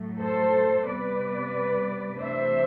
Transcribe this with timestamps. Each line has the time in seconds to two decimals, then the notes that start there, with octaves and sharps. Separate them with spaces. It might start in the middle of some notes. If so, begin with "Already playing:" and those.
Already playing: A2 F#3 A3
0.20 A4 C5
0.86 C3 G3 B3 B4 D5
2.18 C3 E3 A3 D4 C5 E5